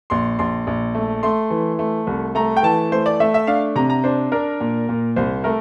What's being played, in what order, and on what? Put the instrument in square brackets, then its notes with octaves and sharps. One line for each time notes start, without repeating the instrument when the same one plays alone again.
[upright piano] A#1 [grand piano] C6
[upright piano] A#1 [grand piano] C6
[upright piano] A#1
A3
[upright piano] A3 [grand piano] C6
[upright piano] E3
A3
C2
[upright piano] A3 [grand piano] A#5
[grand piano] G5
[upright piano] E3 [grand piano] A5
[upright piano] A3 [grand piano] C5
[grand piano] D5
[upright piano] A3 [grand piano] E5
[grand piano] E5
[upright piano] D4 [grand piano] F5
[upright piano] C3 [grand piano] A#5
[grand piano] A#5
[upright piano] D4 [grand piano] C5
[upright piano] D4 [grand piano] A#4
[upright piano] A#2
A#2
[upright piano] C2 [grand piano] C5
[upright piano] A3 [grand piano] A#4